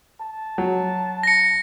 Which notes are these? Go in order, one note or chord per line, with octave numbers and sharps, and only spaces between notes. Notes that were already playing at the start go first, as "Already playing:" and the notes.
A5
F#3
A#6 C#7